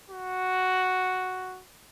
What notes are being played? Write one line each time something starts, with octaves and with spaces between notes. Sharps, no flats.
F#4